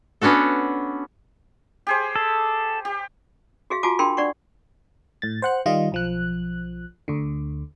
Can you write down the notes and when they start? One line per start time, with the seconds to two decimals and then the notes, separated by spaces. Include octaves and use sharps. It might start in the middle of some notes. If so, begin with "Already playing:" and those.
0.21 B3 C#4 D4 F#4 A4
1.87 G4 G#4 C5
2.16 A4
2.85 G4
3.70 F#4 G#4 E5 F5
3.83 F4 F#4 F5 G#5 A5 D6
3.99 D4 G#4 A#4 G5 B5 C6
4.17 D4 D5 F#5 C#6
5.22 A2 A6
5.42 C5 F#5 F#6
5.66 D#3 G3 F4 D#5
5.92 B1 F3 F#6
7.08 D2 D3